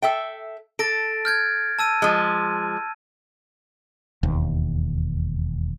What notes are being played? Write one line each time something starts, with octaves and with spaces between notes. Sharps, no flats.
A4 E5 G5
A4 A6 A#6 D7
F6 G6 G#6
A5 E6 D#7
F3 G#3
E1 D#2